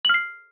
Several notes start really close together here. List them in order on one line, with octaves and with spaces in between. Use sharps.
F#7 F6 C7